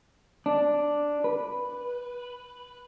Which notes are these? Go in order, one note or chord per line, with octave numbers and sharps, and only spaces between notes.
D4
B4